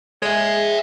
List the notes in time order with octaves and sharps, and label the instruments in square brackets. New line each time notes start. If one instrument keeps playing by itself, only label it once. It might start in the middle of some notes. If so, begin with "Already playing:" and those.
[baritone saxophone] G#3 [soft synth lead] G#4 [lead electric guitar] C#5 E5